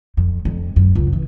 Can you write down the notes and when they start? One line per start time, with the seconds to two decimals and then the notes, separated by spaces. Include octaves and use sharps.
0.17 F2
0.45 F2
0.76 F#2
0.95 C#2
1.13 E3